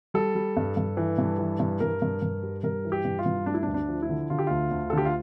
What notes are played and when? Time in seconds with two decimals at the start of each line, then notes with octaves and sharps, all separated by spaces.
0.14 G3 A4
0.35 G3
0.57 G2
0.77 G2
0.97 E3
1.18 G2
1.39 E3
1.60 G2
1.80 G2 A#4
2.02 G2
2.22 G2
2.43 G3
2.64 G2 A#4
2.85 E3
2.92 G4
3.05 G2
3.19 F4
3.26 G2
3.46 A3 D4
3.54 E4
3.63 D4
3.67 D2
3.74 D4
3.88 F3
4.02 E4
4.09 D3
4.30 D3 F4
4.39 G4
4.47 D2 F4
4.71 D2
4.90 A4
4.93 D3 G4
5.05 F4